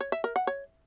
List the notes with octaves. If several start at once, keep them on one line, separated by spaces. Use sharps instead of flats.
C#5
E5
A#4
F#5
C#5